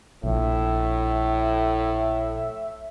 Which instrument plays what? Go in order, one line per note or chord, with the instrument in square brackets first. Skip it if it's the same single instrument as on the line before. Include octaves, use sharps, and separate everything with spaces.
[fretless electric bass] A#1 F3 [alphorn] A2 [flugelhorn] E5